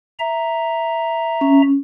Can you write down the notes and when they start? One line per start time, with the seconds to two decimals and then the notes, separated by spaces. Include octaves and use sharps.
0.20 E5 A#5
1.41 C#4